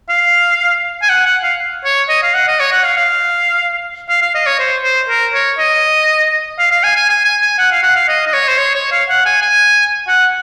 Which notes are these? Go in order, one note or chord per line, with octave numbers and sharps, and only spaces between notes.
F5
G#5
F#5
F#5
F5
C#5
D#5
F5
F#5
D#5
C#5
F#5
F5
F5
F5
F5
D#5
C#5
C5
C5
A#4
C#5
D#5
F5
F5
G#5
G#5
G#5
G#5
G#5
F#5
F5
F#5
F5
D#5
D#5
C#5
C5
C#5
C#5
F5
F#5
G#5
G#5
F#5